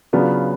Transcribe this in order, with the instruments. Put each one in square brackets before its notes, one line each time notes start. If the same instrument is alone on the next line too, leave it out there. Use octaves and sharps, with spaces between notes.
[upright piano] C#3 F#3 B3 D4 F4